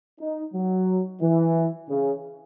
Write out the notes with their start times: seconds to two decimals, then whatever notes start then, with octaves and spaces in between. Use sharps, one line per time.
0.20 D#4
0.54 F#3
1.21 E3
1.89 C#3